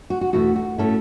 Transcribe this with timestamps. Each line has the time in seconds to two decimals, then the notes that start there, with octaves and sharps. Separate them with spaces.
0.10 F#4
0.21 F#4
0.33 E2 B2 A3 E4 F#4
0.56 F#4
0.78 A2 A3 C#4 E4 A4